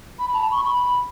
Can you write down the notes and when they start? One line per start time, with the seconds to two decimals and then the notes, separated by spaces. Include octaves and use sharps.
0.18 B5
0.33 A5
0.39 B5
0.51 C#6
0.61 B5